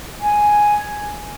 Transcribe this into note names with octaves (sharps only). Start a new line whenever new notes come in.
G#5